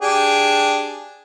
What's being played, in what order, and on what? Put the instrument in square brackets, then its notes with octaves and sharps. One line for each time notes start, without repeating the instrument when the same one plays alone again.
[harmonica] D4 G4 G#4